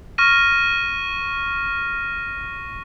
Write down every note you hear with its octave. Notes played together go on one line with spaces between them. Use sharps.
C#6 F6 A#6 D#7